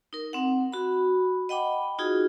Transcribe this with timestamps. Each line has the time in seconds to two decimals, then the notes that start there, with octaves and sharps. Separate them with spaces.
0.13 D#4 A#4
0.33 C4 F#5
0.73 F#4 B5
1.49 D#5 F#5 G5 B5 D6
1.99 D#4 F4 F#4 G#4